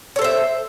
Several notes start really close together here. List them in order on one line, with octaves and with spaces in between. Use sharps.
C#5 A4 C5 E5